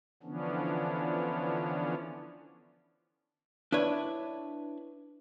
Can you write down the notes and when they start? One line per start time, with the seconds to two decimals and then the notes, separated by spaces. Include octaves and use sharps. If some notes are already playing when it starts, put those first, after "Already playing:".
0.23 D3 E3 F3 B3 C#4 D4
3.72 D4 E4 B4 C#5